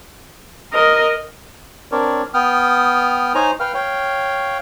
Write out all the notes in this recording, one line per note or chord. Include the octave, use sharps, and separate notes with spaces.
A#4 D#5
C4 D4 A#4 C#5 D5
B3 G5 D#6 F6
D#4 C5 C#5 G#5 A#5
B4 F5 G5 F6
C#5 F5 G5